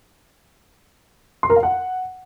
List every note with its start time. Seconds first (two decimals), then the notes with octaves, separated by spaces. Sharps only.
1.43 C6
1.50 A#4
1.56 F5
1.63 F#5